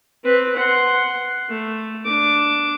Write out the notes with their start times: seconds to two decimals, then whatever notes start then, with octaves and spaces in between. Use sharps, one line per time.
0.24 C4 B4
0.56 F#5 C6
1.49 A3
2.05 D4 D6